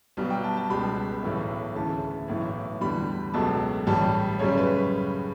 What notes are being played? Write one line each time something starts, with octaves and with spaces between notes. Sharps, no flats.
B1 B2 G3
G5
A5
A5
C#2 B2 G3 B5
B1 A2 E3 A3
D2 C#3 E3 A5
B1 A2 E3
E2 D3 G3 B5
C#2 B2 F#3 A3 A5
A1 A2 G3 A5
F#2 C#3 G3 C#5
B4